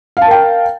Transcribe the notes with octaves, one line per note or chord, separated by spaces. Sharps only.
A#4 F5 G5 A5